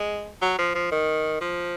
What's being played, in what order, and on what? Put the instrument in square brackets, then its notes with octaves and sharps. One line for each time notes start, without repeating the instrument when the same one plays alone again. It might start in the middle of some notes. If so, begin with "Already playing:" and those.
Already playing: [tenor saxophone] G#3
F#3
F3
F3
D#3
F3